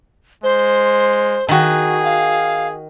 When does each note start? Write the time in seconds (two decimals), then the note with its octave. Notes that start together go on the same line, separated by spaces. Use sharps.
0.43 G#3 C5
1.49 D#3 F#4 G#4
2.05 F5